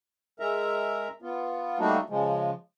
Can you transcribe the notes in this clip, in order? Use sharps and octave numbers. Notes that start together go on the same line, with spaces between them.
G#3 A#4 E5 A#5
B3 F4
G3 A3 A#3 D4 D#4 F#4
C#3 F3 G#3